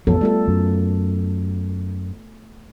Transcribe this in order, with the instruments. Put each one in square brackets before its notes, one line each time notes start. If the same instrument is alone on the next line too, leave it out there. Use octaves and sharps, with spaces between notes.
[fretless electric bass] A1 F2 F#3 [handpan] B3 A4
[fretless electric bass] G3 [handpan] A3 F4 A4
[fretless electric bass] F#2